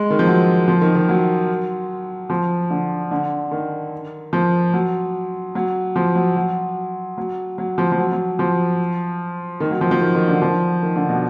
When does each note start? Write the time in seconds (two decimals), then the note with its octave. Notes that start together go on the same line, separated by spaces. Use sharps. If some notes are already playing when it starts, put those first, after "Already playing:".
Already playing: G#3
0.10 D#3
0.19 F3
0.27 F#3
0.68 F3
0.81 D#3
0.95 D#3
1.09 F#3
2.30 F3
2.70 D3
3.11 D3
3.51 D#3
4.33 F3
4.74 F#3
5.55 F#3
5.96 F3
6.15 F#3
6.36 F#3
7.18 F#3
7.58 F#3
7.78 F3
7.92 F3
7.98 F#3
8.12 F#3
8.39 F3
9.60 D#3
9.71 F#3
9.81 F3
9.91 F3
10.01 D#3
10.15 D#3
10.28 D3
10.42 F3
10.82 D#3
10.96 D3
11.09 B2